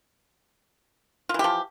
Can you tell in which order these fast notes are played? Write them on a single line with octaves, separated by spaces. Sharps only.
F4 E3 G4 F3